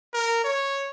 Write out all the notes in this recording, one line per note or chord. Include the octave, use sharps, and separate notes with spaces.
A#4
C#5